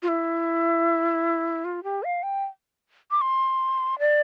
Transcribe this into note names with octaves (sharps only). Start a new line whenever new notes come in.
F4
E4
F4
G4
F5
G5
D6
C6
D5